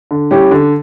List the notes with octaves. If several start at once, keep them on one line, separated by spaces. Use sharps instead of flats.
D3
G3 C#4 E4 G4
D3